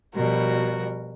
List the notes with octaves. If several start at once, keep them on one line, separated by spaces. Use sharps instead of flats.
B2 F3 G3 F#4 A#4